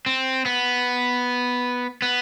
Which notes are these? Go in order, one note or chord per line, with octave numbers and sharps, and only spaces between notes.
C4
B3
B3